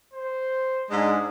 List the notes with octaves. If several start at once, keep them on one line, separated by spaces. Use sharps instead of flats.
C5
G#2 G#3 D4